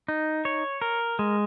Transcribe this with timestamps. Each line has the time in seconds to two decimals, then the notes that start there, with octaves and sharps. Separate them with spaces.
0.08 D#4
0.45 C#5
0.82 A#4
1.19 G#3